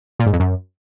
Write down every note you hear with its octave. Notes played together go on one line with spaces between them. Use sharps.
A#2
G#2
F2
F#2